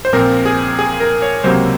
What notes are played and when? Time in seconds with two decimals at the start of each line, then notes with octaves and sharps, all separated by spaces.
0.05 C5
0.13 A#1 A#2 F3 C4 A#4
0.45 G#4
0.79 G#4
1.00 A#4
1.22 C#5
1.44 C#2 C3 F#3 A#3 C5